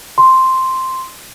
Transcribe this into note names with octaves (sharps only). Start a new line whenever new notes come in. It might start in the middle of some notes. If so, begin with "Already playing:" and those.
C6